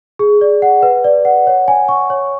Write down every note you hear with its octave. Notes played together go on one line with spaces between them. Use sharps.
G#4
D5
F#5
B4
D5
F#5
C#5
G#5
C#6
C#5